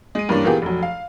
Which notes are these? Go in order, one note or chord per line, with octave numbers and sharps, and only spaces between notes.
G#3 D#7
G2 E3 A#3 C#4 D4
A#2 E3 A#3 B3 G4 G#4
F1 F#3
F5